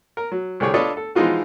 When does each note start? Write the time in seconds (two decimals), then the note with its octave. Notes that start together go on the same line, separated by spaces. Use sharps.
0.17 A#4
0.32 F#3
0.60 C2 D3 G3 G#4 C#5 G5
0.74 D4 F4 A4 B4 C#5 D#5
0.97 A4
1.15 E3 F3 G#3 D#4 F4 F#4